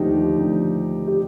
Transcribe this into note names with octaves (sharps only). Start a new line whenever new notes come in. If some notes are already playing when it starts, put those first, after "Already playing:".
Already playing: D#2 D3 F3 A3 D#4 G4
D#2 D3 F3 A3
G4